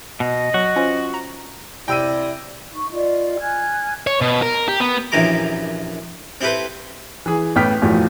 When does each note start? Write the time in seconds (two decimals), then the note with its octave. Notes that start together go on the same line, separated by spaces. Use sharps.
0.20 B2 D#5
0.54 F#3 F#4
0.76 C#4 F4 C5
1.14 A#5
1.88 C3 E4 D5 G5 E6 A#6 D#7
2.74 D#4 C#6
2.91 F4 D5 D#5
3.39 G#5 F6 F#6 G#6
4.07 C#5
4.21 B2
4.42 A#4
4.68 G4
4.80 B3
5.12 A#1 F#2 E3 G4 A#5 D6
6.41 C4 E4 G4 A4 B4 C5
7.26 E3 G#4
7.56 A1 A2 B3 G5 F6 B6
7.82 E2 A2 F3 F#3